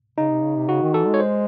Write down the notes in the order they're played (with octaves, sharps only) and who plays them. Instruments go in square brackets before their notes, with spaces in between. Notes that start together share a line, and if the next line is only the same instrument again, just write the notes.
[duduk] C#3 [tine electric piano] D#4
[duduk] C3
C#3
C3
[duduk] C#3 [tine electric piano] F#4
[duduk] D#3
[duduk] E3 [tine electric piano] A4
[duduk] G#3
[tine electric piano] C#5
C5